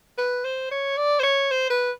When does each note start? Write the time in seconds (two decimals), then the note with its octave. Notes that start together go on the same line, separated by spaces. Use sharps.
0.18 B4
0.44 C5
0.71 C#5
0.97 D5
1.19 C5
1.23 C#5
1.51 C5
1.70 B4